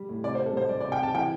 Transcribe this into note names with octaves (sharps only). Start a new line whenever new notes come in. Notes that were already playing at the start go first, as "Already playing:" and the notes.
Already playing: G3
A2
C3 D5
C5
C3
A4
G3 C5
G3 D5
D5
C3
G5
C3 A5
E3 G5